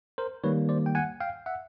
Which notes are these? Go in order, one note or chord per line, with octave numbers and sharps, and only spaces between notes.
A#4 C5
D#3 G3 A#3 B4 C#5
C5 D5
G5
F#5 G#5
F5 G5
E5 F#5